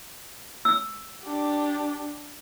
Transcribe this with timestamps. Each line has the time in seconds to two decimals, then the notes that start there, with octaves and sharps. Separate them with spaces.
0.65 E6
1.24 D4 G4